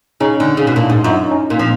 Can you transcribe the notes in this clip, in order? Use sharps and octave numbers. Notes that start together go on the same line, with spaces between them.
C#3 C#4 D#4
D3
C#3
B2
A#2 D4 E4
G#2
F#2 D#4 F4
C#4 D#4
A#2
F3 C4 D4